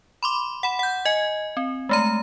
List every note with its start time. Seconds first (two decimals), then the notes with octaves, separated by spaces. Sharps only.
0.23 B5 C6 D6
0.63 F#5 B5
0.79 F#5 G6
1.05 D#5 G#5
1.57 C4
1.89 G#3 A3 A#5